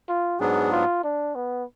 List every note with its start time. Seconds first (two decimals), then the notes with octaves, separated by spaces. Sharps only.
0.09 F4
0.40 G#2 F#3 B3 D4 G#4
0.72 F4
1.04 D4
1.35 B3